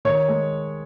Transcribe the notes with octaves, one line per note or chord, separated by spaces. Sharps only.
D#3 C#5
G#3